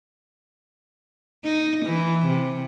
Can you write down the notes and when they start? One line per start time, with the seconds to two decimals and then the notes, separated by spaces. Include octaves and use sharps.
1.44 D#4
1.86 E3
2.26 C3